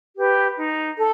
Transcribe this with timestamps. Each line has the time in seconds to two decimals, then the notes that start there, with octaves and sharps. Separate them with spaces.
0.15 G4 B4
0.56 D#4
0.96 A4